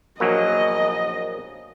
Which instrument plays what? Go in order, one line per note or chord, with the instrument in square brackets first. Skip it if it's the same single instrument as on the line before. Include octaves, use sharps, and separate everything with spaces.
[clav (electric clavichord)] A#1 F#3 A#3 [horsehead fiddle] D#5